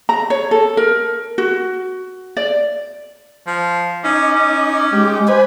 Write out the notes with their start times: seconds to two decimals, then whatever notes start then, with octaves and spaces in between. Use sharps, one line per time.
0.09 A#5
0.30 C#5
0.51 A4
0.77 A#4
1.38 F#4
2.37 D5
3.47 F3
4.04 C#4 D#4 D6
4.35 C#4
4.93 G#3 G4
5.28 B4 C5 G#5